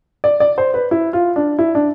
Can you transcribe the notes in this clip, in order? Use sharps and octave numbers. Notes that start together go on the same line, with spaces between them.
D5
D5
C5
B4
E4
F4
D4
E4
D4